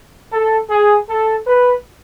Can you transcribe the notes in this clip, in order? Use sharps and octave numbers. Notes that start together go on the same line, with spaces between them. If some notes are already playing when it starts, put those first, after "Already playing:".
A4
G#4
A4
B4